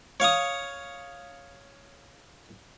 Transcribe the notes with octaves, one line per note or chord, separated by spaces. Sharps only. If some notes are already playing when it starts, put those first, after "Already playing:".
C#5 F5 C#6 D#6